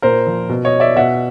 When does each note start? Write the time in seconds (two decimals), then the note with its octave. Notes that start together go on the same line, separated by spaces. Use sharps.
0.02 A#2 A#4 C5
0.27 F3
0.49 B2
0.65 C#5 D#5
0.80 D5 E5
0.96 B2 E5 F#5